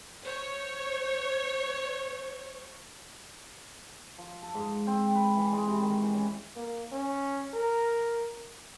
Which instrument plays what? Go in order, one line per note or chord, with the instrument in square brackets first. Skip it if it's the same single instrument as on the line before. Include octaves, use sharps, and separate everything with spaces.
[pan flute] C5 [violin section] C#5
[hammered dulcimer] F3
A4
G#2
C4
B4
E3
G#3
C3
D#3
E3
C#4
[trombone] A#3
C#4
A#4